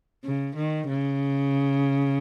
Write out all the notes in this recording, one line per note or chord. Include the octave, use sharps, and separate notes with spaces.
C#3
D#3
C#3